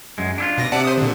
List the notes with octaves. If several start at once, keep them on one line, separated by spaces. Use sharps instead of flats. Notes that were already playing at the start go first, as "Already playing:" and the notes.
F#2 G#3
D4 E4 F4
B2 A#6
C3 D5 F#5 A5
C5 D#6
A#2 D3